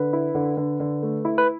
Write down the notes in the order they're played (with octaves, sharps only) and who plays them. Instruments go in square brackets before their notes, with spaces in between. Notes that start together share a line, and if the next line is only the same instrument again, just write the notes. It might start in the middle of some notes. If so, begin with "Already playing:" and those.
Already playing: [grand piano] D3 [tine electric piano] B4
[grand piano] E4
D3
D3
D3
A3
E4
[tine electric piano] B4